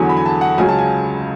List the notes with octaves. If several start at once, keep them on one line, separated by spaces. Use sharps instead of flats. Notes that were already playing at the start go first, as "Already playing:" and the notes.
Already playing: E2 D3 F#3 G#5
B5
G#5
A5
F#5
C#2 C#3 F#3 G#5
A5
G#5